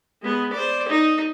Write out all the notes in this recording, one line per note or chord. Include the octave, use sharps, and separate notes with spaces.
G#3 B3
C5 D5
D#4